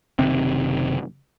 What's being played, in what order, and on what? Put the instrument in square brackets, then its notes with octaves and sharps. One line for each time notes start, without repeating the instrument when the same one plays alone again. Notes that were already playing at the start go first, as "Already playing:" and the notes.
[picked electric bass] F#1 C3 D#3 C4